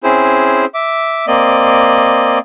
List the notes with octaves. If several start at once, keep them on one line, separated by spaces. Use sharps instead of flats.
C4 C#4 E4 G#4 C5
E5 D6
A#3 C4 D5 D#5